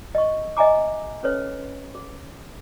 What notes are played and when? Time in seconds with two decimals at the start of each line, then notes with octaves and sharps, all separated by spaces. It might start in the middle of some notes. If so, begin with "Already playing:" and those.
0.15 D#5 C#6
0.57 D#5 E5 G#5 A#5 D6
1.23 C#4 A4 B4 C#5
1.95 G#4